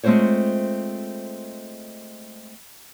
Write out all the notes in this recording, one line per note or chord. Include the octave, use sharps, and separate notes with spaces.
G#3 A3 C4 F4 C5 C#5